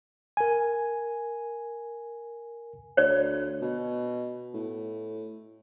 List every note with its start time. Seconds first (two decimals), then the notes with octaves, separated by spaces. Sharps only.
0.37 A#4 G#5
2.97 D2 C#5 D5
3.62 B2
4.54 A2